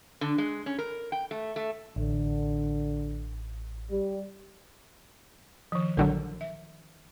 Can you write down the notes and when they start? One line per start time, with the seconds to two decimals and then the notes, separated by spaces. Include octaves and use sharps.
0.21 D3
0.38 G#3
0.66 C#4
0.79 A#4
1.12 G5
1.31 A3
1.56 A3
1.96 A1 D3
3.90 G3
5.72 D#3 F3
5.97 A#1 D3 F#3 A#4
6.41 E5